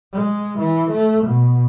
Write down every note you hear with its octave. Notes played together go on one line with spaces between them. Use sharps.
G#3
E3
A3
B2